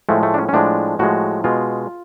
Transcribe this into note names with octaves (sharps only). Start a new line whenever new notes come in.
A2 F3 G#3 A3
A3
D4
C#4
C#4
A2 F3 G#3 D4
A2 F3 G#3 F#4
B2 G#3 F4